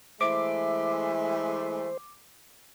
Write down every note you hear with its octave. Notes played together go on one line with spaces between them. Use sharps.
E3 G#3 A3 C5 E5 D6